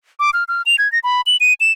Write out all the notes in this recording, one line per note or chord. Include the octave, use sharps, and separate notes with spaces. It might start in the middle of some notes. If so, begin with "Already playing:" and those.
D6
F6
F6
F7
G#6
A#6
B5
F#7
D#7
E7